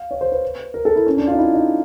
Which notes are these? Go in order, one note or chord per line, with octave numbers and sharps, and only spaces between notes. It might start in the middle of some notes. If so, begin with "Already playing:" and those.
Already playing: F5
C#5
C5
B4
A#4
A4
E4
C#4
D4
F4
D#4
E4
D#4